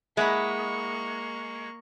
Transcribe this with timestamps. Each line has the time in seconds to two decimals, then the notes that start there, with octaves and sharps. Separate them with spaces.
0.17 G#3 A#3 E4 F#5 B5 C#6